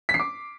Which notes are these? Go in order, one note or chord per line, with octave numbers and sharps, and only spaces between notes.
B6
C7
D6